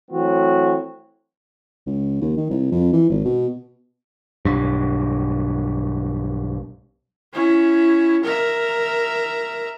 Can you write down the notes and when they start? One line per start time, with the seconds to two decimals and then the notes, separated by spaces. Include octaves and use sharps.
0.11 E3 F#3 A3 C4 F#4
1.86 C#2
2.21 D#2
2.37 D#3
2.50 C2
2.71 F2
2.93 E3
3.10 G#1
3.25 B2
4.45 B1 G2
7.33 C#4 E4
8.24 A#4 E5